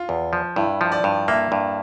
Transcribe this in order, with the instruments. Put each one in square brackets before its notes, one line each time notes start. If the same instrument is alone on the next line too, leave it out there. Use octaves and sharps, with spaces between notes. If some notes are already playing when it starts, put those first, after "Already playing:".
Already playing: [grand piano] F4
[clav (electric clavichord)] E2
F3
[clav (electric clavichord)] G2 [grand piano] E4
[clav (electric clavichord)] F3
[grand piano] D5
[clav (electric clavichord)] G2
[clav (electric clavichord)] A#3 [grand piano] E5
[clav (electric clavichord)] G2